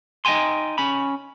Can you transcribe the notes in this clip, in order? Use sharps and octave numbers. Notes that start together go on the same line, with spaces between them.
D#4 D#5 F5 G5 G#5 C6
C#4 B5